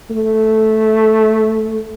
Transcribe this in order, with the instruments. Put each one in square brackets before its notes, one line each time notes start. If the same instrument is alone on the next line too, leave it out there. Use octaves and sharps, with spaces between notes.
[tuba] A3